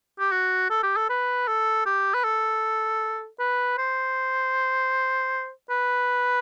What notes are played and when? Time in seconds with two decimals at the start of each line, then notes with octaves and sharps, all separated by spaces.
0.20 G4
0.32 F#4
0.70 A4
0.83 G4
0.96 A4
1.09 B4
1.47 A4
1.86 G4
2.14 B4
2.24 A4
3.39 B4
3.78 C5
5.70 B4